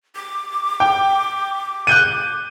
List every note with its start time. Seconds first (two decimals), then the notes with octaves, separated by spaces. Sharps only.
0.16 D6
0.80 G5
1.87 F#6 G6 D#7